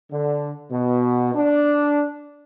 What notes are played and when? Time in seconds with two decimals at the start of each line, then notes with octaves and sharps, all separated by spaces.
0.12 D3
0.71 B2
1.34 D4